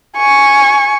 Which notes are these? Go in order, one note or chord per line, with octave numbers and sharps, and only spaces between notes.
G#5 C#6